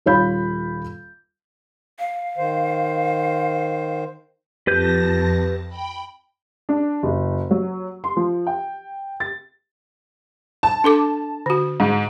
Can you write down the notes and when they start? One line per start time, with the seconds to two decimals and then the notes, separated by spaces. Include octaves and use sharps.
0.06 D#1 F4 C#5 F5 B5 G6
1.99 F5
2.38 D#3 C5
4.67 F2 G4 B4 A5 G6 A#6
5.68 G5 B5
6.69 D4
7.03 F#1
7.51 F#3
8.04 C6
8.17 F3
8.47 G5
9.20 A6
10.63 A5
10.84 D4 A4 D6
11.46 D3 F#4
11.80 G#2